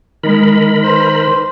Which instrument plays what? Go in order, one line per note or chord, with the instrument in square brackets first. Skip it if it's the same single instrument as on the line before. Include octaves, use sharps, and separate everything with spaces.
[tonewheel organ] D#3 A#4 B5 [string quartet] G#3
[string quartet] B4 C5